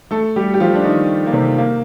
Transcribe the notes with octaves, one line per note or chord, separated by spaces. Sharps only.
A3 A4
G3 G4
G4
F3 F4
D4
D#3 D#4
A#3
C3 C4
A#3